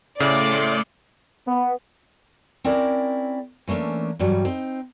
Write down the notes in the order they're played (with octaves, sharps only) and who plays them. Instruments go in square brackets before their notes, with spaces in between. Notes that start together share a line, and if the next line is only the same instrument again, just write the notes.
[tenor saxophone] A2 [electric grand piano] C#3 [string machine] A3 C6 C#7 [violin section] D5
[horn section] B3
[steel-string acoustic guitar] C4 C#4 E4 A#4 D5
E3 A3 A#3 C#4 D4
G2 E3 F#3 G3
C4 D#4